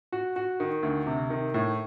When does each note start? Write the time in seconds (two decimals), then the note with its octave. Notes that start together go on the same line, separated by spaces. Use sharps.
0.12 F#4
0.36 F#4
0.60 D#3
0.83 D2
1.07 C3
1.30 D#3
1.54 A2